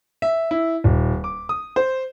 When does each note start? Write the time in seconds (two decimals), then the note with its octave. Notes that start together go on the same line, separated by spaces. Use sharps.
0.22 E5
0.51 E4
0.84 D#1
1.24 D6
1.49 D#6
1.76 C5